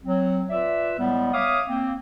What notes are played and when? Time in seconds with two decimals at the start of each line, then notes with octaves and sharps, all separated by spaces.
0.04 F#3 C4
0.50 F4 B4 D5 E5
0.99 A2 G3 G#3 B3
1.34 C#5 E5 F5 D6 D#6
1.68 A#3 C4